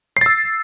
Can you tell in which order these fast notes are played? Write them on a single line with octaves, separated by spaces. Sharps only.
C7 A6 E6